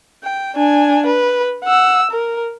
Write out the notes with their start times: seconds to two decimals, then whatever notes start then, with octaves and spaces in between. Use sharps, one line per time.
0.23 G5
0.56 D4 G#5
1.06 B4
1.65 F#5 E6
2.11 A#4